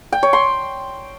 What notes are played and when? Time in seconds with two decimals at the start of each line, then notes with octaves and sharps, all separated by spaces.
0.12 G5
0.23 C#5
0.33 C6